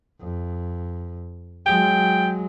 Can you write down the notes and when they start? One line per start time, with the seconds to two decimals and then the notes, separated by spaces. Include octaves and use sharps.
0.21 F2
1.66 F#3 G#3 G5